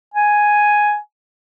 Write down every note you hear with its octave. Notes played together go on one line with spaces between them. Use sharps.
G#5